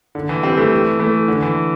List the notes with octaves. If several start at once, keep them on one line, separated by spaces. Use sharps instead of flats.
D3
E3
G3 C4
E3 A3
E3 A3
D3
E3